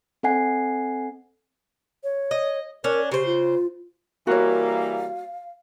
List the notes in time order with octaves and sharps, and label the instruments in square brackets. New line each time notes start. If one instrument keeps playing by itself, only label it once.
[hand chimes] C4 A4 D#5 F#5 G#5 C7
[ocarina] C#5
[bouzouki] D#5
[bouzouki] C#4 D4 [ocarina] A#4
[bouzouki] C#3 C5 [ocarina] G4
[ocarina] F4
[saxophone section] E3 G3 A#3 [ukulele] F#4 C#5 [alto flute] F5